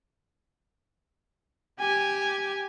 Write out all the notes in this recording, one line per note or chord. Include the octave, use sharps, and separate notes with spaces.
G4 G#5